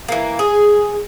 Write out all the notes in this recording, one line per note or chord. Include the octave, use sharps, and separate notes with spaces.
E3 A#3
G#4